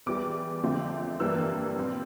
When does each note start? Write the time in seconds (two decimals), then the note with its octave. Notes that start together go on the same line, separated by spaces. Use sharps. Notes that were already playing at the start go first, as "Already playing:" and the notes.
0.06 E2 E3 G3 D6
0.63 F2 D3 F3 A3 C4
1.20 G2 E3 G3 A#3 E6
1.77 A#2 G3 C4